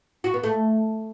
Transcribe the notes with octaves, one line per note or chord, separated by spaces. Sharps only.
F#4
B3
A3